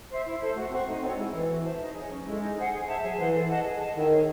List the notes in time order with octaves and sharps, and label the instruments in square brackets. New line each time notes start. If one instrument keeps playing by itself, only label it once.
[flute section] C5 E5
E4
A4 C5
[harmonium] A3 [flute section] F#4
[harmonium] C4 [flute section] C5 F#5 C#6
[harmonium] A3 [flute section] D#4
[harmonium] C4 [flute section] F#4 A4 C#5
[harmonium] G#3 [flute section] E4
[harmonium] E3 [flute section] A4 C#5
[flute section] F#4
C5 E5 A5
D#4
G#4 C#5
[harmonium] F#3 [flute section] C#4
[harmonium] G#3 [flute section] E4 A4
[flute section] D#4
G#4 C5 F#5
G#4
C5 E5 A5
[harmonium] F#3 [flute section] G#4
[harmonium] E3 [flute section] C5 F#5
[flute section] A4
D#5 F#5 A5
G#4
D#5 A5
[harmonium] D#3 [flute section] E4
[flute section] G#4 C#5